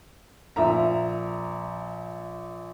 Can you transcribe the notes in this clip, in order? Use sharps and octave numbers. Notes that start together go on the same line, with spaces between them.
A#1 E5 A#5